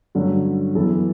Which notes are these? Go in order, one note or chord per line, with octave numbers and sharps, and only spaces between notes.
G2 D3 F#3 A3 C#4
F#2 E3 B3 A4